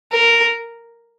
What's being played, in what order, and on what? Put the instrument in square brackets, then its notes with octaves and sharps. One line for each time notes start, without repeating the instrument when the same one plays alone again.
[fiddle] A#4